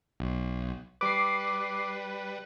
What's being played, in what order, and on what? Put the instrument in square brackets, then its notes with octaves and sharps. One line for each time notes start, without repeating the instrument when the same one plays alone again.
[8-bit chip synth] B1
[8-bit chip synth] G3 B4 [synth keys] D6 C7